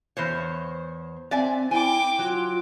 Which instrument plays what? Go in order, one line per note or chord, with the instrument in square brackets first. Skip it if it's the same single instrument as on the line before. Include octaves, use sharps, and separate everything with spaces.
[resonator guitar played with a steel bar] E2 C5 C#5
[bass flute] C4 [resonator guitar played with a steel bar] D5 E5 G#5
[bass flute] E4 [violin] G5 D6 [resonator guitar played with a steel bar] G#5
[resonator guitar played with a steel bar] F#3 [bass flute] F4